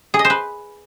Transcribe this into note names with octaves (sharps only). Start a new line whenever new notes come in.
G#4
D#5
C5
B4